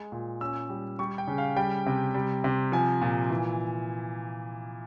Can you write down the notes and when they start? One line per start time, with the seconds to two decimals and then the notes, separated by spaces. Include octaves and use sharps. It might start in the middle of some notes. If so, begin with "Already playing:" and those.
Already playing: G#3
0.12 A#2
0.41 C#4 E6
0.69 G3
0.99 G3 C#6
1.18 G5
1.28 C#3
1.38 F5
1.56 G3 G5
1.86 C3
2.14 G3
2.44 C3
2.72 F3 G#5
3.02 A#2
3.30 E3